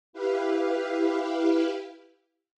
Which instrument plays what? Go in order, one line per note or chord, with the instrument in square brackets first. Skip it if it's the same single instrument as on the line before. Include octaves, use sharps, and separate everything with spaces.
[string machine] E4 G4 B4 F5